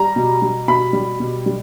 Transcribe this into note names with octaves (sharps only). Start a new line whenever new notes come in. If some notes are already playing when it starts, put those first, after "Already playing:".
Already playing: G3 A#5
B2
G3
B2 B5
G3
B2
G3